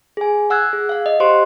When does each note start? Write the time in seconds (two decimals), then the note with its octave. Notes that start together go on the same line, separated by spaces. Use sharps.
0.17 G#4 G#5
0.50 F#5 E6 F#6 G#6
0.73 G#4
0.89 F5 F#5
1.06 D#5
1.20 G4 C5 C6